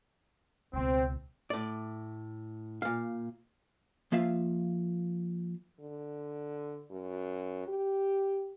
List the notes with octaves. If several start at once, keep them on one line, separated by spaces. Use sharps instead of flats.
C#2 B2 C4
A2 D5
A#2 F5
F3 A#3 F4 E5 F5
D3
F#2
G4